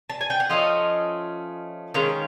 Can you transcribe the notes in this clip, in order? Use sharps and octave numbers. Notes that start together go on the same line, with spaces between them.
A5
G#5
G5
F#5
F3 A3 C#4 D#5 F5
D#3 G#3 C#4 F5